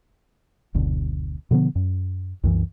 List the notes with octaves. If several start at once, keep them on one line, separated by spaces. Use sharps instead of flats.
F#1 D2 B2
B2 D3 F3 B3
F#2
C2 F#2 E3